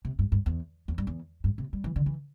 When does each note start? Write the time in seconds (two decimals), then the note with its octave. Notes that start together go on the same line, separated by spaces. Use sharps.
0.05 C3
0.19 G2
0.32 G2
0.46 E2
0.88 E2
0.98 G2
1.07 E2
1.44 G2
1.58 C3
1.73 G3
1.84 E3
1.96 D3
2.06 E3